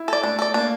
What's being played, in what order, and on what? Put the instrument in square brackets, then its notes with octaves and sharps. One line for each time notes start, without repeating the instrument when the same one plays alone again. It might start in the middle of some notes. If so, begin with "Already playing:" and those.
Already playing: [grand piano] E4
[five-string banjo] A4 D5
[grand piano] A3 [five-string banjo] D4
[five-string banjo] A4 D5
[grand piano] A#3 [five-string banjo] D4